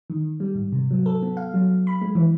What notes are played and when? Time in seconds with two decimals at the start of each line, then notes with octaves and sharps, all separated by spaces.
0.10 D#3
0.40 G3
0.55 G#2
0.72 C3
0.91 F#3
1.06 A4
1.22 B3
1.37 F5
1.54 F#3
1.87 B5
2.02 G#3
2.15 E3